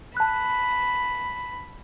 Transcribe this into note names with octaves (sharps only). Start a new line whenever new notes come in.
A5 B5 F#6